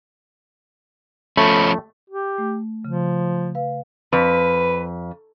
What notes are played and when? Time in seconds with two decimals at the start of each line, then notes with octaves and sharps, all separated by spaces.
1.37 F3 A3 C#4 B5
2.10 G4
2.38 A3
2.85 C#3 F3
3.55 B4 F5
4.13 F2 B4